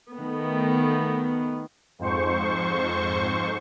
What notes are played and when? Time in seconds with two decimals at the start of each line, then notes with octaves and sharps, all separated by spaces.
0.14 D#3 A3 B3
1.99 F2 G#2 C5 C#6